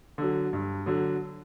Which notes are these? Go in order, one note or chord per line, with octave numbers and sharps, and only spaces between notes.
D3 F#3
G2
D3 F#3